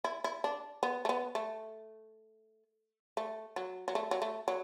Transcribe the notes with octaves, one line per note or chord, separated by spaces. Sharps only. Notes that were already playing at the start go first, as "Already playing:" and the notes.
E4
E4
D4
B3
A3
B3
A3
A3
F#3
F#3
A3
F#3
A3
F#3